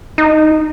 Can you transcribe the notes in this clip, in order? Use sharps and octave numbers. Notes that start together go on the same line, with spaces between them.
D#4